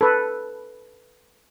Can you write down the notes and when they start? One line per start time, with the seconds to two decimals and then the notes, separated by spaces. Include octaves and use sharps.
0.01 A4 B4